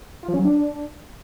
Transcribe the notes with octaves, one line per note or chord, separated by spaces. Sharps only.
F4
F3
C#4
F#3
D4